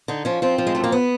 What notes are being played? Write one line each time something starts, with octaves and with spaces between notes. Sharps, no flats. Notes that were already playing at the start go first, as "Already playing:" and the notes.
D3 D#4
F3 C#4
F3 C4
F3
G#3
F#2 A3
A#3
B3